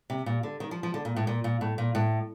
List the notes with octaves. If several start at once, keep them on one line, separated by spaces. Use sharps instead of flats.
C3
A#2
D3
D#3
F3
F3
D3
A#2
A2
A#2
A#2
A2
A#2
A2